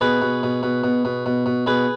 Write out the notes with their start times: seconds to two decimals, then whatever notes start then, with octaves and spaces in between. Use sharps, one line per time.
0.01 B2 G#4 B4
0.22 B2
0.43 B2
0.63 B2
0.84 B2
1.05 B2
1.26 B2
1.46 B2
1.66 B2 G#4 B4